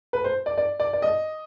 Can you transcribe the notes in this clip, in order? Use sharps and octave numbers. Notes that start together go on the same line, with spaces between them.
B4
C5
D5
D5
D5
D5
D#5